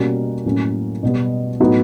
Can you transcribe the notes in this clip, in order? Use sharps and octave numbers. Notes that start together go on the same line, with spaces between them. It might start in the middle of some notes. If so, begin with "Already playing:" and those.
Already playing: B2 G3 A#3 C#4 F#4
A2 F#3 A#3 C#4
B2 G3 B3
A2 F#3 B3 D#4 F#4